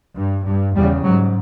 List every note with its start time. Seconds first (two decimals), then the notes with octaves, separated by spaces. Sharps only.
0.16 G2
0.46 G2
0.75 E2 C#3 G3
1.05 G#2 F#3